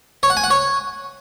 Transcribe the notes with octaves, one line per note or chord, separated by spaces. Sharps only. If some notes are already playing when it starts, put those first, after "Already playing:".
C#5
F#5
G#5
F#5
C#5